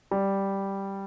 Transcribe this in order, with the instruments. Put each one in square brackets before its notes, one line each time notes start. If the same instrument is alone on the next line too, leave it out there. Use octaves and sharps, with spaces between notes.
[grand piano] G3